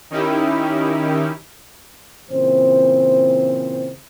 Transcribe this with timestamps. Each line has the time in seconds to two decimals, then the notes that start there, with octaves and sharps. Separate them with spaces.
0.10 D#3 C#4 D#4 E4 G4
2.30 A#2 C#3 E3 C4 C5